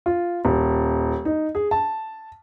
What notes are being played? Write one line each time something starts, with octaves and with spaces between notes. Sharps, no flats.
F4
D#1
D#4
G#4
A5